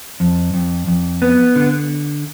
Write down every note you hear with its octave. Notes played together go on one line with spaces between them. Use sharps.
F2
F2
F2
B3
D3